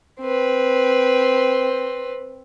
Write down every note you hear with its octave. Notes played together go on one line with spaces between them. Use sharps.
C4 B4